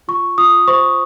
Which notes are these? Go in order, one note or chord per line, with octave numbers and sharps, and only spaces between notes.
F4 C#6
F4 D#6
C5 C#6